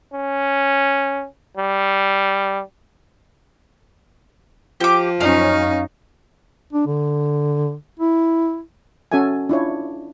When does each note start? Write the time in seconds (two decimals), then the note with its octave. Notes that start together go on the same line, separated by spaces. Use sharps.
0.13 C#4
1.57 G3
4.80 F3 G4 D6
5.21 F#2 C#4 D#4 F5
6.73 D4
6.86 D3
8.00 E4
9.12 C#4 F#4 A4 E5 G#5
9.49 D4 E4 F4 C#5